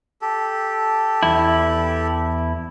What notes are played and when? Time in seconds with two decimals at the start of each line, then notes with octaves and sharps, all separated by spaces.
0.22 G4 A4
1.23 E2 E4